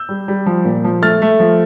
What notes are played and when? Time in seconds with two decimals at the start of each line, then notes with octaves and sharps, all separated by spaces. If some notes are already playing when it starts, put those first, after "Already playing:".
Already playing: E6 G6
0.09 G3
0.28 G3
0.46 F3
0.65 A#2
0.84 F3
1.02 A3 F6 A6
1.22 A3
1.40 F3